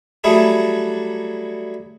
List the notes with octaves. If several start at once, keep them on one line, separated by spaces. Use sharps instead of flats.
F#3 G3 A3 E4 F#4 G#4